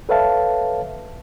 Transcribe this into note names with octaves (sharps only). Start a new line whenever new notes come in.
A4 B4 C#5 E5 F5 A5